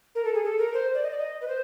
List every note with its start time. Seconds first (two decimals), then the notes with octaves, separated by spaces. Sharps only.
0.15 A#4
0.25 A4
0.34 G#4
0.45 A4
0.59 A#4
0.74 C5
0.94 D5
1.03 D#5
1.10 D5
1.18 D#5
1.41 B4
1.48 C5